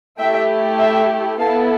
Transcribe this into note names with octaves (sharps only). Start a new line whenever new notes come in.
A3 E4 G4 E5 G5
E5 G5
B3 E4 A4 F5 A5